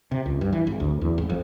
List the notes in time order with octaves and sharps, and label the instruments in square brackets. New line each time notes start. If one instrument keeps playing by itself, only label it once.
[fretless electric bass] C3
C#2
G2
E3
G#1
D2
E2
G#1
F2